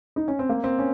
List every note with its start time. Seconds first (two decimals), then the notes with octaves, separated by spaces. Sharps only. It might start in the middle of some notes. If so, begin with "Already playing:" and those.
0.16 D#4
0.28 C#4
0.39 C4
0.49 A#3
0.64 C4
0.79 C#4